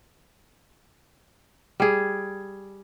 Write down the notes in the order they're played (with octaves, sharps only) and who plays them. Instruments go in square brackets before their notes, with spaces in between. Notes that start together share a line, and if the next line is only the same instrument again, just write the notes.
[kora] G3 G#4